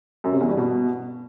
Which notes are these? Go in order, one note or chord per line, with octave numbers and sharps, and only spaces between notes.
F#2
C3
E2
G2
B2